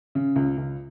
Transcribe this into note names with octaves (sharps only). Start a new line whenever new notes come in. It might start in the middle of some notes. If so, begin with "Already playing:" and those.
C#3
C#2
C#2